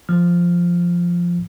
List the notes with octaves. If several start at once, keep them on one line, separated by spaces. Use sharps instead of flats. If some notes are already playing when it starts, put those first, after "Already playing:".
F3 F6